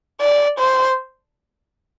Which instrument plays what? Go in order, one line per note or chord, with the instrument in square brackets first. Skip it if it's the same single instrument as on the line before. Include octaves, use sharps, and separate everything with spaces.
[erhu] D5
C5